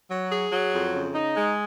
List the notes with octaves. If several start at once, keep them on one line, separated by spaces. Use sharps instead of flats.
F#3
G#4
F#3
F2
C#3
D#4
G#3